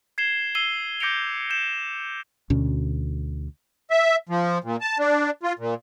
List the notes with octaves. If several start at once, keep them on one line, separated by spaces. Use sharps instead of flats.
G#6 C7 E7 G7
E6 C7 D#7 G7
D6 G6 A#6 C#7 D7 F7
G6 E7
D2 B2 C#4
E5
F3
A#2
A5
D4
F4
A#2